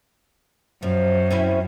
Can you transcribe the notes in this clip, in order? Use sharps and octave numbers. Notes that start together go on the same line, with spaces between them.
F#2 F3
C4 C#4 E4